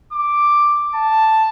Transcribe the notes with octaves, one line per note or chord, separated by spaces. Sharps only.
D6
A5